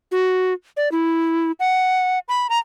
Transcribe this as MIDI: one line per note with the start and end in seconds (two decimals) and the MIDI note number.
0.12 0.53 66
0.77 0.91 74
0.92 1.52 64
1.60 2.19 78
2.28 2.47 83
2.50 2.58 82